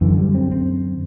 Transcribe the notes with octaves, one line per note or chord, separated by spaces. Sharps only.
F#2 D3 E3
G3
C4
C4